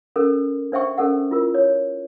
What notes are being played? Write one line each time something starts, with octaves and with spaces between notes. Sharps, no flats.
C#4 A4 A#4
D4 C5 E5 G5 C#6
C#4 A4 A#4 F#5
E4 F4 A#4
C#5